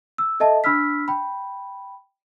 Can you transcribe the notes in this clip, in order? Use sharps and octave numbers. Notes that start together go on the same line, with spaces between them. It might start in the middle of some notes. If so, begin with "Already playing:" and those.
E6
A4 D#5 E5 A5
D4 B5 E6 F6 B6
G5 B5